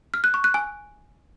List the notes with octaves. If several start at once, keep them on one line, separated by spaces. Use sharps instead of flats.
F6
F#6
C#6
F#6
G#5